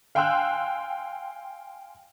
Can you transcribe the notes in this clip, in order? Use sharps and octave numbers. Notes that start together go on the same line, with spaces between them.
F5 G5 G#5 C6 E6 F#6